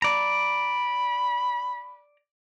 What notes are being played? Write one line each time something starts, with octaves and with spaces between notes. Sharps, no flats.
D5 A#5 B5